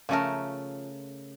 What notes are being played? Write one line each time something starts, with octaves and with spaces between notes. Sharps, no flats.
C#3 F3 A3 C#4 A#4 A5